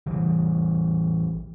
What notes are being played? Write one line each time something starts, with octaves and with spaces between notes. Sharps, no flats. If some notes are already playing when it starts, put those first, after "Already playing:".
A1 E3 G3